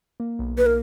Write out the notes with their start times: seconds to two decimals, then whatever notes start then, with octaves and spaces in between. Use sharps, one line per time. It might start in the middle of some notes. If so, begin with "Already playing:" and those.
0.20 A#3
0.39 B1
0.58 A#3 B4
0.66 A#4